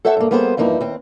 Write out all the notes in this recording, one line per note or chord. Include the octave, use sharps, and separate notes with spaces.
A4 C5 C#5 E5 F#5 A5
G2 A#3
G3 A#3 B3 G#4 C5
E2 G2 F3 A#3 D#4 E4
D#2 C4